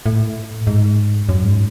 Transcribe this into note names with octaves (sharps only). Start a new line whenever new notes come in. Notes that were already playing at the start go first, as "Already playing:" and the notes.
A2
G#2
F#2
G#2